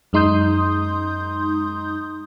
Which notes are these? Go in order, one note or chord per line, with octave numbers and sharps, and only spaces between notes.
F#2 G#3 D#4 C6 D#6 G6